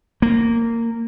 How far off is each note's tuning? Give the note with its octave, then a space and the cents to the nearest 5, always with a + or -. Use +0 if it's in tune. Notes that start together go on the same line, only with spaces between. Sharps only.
A#3 -15